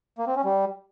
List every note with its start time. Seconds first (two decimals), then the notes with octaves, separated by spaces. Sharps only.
0.19 A#3
0.27 C4
0.36 C#4
0.45 G3